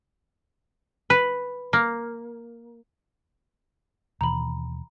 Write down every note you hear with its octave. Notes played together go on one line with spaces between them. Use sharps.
B4
A#3
D#2 B2 E3 A#5 B5